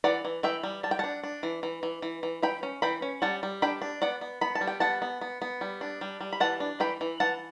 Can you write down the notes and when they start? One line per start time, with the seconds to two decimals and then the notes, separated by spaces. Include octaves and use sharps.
0.04 E3 D5 F#5
0.25 E3
0.43 E3 E5 G5
0.63 G3
0.83 G3 A5
0.91 G5
0.99 D4 F#5 A5
1.23 D4
1.43 E3
1.63 E3
1.83 E3
2.02 E3
2.23 E3
2.42 E3 G5 B5
2.63 C#4
2.82 E3 G5 B5
3.02 C#4
3.22 G3 F#5 A5
3.43 G3
3.62 D4 G5 B5
3.82 D4
4.02 B3 D5 F#5
4.21 B3
4.41 B3 B5
4.55 A5
4.61 G3
4.67 G5
4.80 B3 F#5 A5
5.02 B3
5.21 B3
5.42 B3
5.61 G3
5.81 D4
6.01 G3
6.20 G3
6.32 B5
6.40 E3 F#5 A5
6.60 D4
6.80 E3 G5 B5
7.01 E3
7.20 E3 F#5 A5